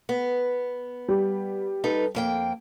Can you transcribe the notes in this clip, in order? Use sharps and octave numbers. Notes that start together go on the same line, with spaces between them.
B3
G3
D#4 A4 B4
F2 A#3 G5